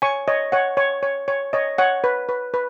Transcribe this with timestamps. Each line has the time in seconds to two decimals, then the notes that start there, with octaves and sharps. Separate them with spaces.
0.02 C#5 G#5 C#6
0.28 C#5 D#5
0.52 C#5 F#5
0.77 C#5
1.03 C#5
1.28 C#5
1.53 C#5 D#5
1.78 C#5 F#5
2.04 B4
2.29 B4
2.54 B4